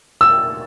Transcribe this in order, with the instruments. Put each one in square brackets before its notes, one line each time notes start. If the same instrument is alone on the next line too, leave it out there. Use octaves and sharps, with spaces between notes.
[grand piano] E6